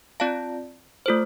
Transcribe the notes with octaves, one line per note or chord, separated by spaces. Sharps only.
C4 F4 D5 F5 A5
A3 F4 A4 C5